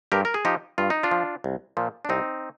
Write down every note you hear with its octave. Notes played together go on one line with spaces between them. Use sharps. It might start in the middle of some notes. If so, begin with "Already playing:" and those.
G2 G4 A#4
A#4
G#4
F3 D#4 G4
G2 F4
D#4
D4 F4
F3
C2
A#2 F3
D4
C2 C4 D#4